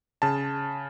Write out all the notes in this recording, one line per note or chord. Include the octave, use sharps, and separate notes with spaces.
C#3 A5